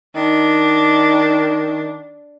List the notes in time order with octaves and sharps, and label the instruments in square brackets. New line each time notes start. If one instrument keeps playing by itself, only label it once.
[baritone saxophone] D#3 [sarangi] D4